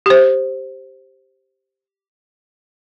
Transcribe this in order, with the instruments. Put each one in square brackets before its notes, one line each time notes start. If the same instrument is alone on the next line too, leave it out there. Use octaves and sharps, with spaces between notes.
[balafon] G4 C5